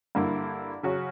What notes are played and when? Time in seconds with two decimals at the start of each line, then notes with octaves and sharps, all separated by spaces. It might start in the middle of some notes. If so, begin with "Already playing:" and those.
0.15 G2 D3 A#3 E4
0.83 C#3 F#3 C#4 F#4